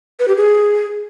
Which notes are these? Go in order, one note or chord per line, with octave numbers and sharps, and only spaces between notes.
B4
G4
G#4